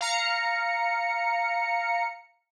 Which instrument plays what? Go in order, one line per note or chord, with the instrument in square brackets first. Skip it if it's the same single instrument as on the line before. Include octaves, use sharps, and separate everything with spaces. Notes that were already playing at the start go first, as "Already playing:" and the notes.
[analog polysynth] F5 A#5 C#7